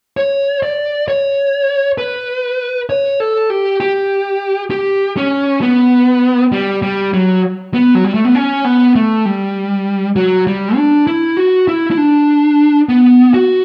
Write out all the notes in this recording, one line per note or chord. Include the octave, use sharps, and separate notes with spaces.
C#5
D5
C#5
B4
C#5
A4
G4
G4
G4
C#4
B3
G3
G3
F#3
B3
F#3
G3
A3
B3
C#4
B3
A3
G3
F#3
G3
D4
E4
F#4
E4
E4
D4
B3
F#4